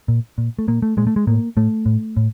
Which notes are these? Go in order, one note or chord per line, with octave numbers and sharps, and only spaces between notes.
A#2
A#2
A3
A#2 A#3
A3
A#2 G#3
A3
G#3
A2 A#3
A2 A3
A2
A2